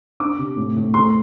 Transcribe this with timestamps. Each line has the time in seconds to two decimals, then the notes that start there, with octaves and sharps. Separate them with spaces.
0.20 D4 D6
0.39 C3
0.57 A2
0.76 A2
0.94 A3 C6